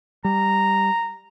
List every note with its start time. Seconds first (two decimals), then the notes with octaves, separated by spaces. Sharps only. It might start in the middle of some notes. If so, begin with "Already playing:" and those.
0.25 G3 A#5